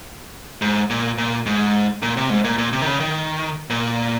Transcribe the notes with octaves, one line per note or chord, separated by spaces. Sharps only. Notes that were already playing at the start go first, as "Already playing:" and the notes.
G#2
A#2
A#2
G#2
A#2
C3
G#2
A#2
A#2
C3
D#3
C#3
D#3
A#2